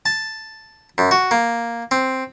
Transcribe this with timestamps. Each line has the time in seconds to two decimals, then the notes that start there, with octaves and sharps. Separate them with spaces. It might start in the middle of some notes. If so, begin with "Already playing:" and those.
0.06 A5
0.98 F#2
1.11 F#4
1.31 A#3
1.91 C4